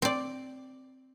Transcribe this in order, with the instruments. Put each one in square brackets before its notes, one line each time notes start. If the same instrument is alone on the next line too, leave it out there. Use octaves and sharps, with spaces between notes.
[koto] C4 D5